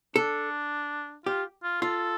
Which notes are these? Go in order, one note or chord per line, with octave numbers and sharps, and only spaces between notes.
D4 A4
F4 G4
F4
F4 A4